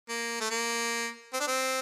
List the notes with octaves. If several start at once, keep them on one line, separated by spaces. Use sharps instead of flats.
A#3
A3
A#3
C4
D4
C4